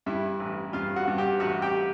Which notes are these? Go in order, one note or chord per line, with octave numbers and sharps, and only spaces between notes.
G2 E4 E5
A1
G2 F4 F5
F#4 F#5
G2
G4 G5
A1 F#4 F#5
G4 G5